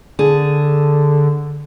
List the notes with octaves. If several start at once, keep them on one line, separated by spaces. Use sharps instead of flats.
D3 G#4 A5